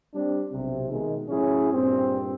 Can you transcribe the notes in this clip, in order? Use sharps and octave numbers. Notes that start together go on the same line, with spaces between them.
G3 C4 D4
B1 C3
B2 D#3 G#3
A2 F#3 C#4 E4 G#4
G2 A#2 C4